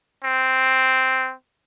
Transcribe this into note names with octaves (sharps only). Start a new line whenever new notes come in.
C4